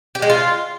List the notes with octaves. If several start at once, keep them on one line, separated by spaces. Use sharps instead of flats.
G4
G#3
F4